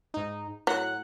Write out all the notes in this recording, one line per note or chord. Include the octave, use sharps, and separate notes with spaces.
G#2 D#4
A2 F#3 F#5 F#6